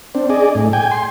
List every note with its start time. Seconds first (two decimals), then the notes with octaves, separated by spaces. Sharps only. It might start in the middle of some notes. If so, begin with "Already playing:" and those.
0.15 C4 D4
0.30 G#4 D5 D#5
0.55 A2
0.73 G5 G#5
0.91 C6